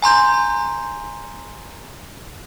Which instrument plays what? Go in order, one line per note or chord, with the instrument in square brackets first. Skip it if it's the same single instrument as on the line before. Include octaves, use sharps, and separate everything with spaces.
[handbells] G#5 A#5 C6 G6